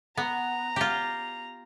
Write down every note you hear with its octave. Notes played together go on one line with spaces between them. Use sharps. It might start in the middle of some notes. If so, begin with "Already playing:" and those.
B3 A#5
F4 G4